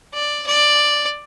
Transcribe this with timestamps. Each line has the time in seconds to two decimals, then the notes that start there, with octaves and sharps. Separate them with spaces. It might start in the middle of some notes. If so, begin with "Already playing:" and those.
0.13 D5
0.47 D5